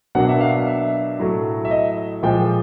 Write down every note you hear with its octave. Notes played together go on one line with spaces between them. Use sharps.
B2 F#3 A#3 D4 F#5
E5
F5
E5
A2 F#3 A3
E5
D#5
A#2 F3 G#3 G5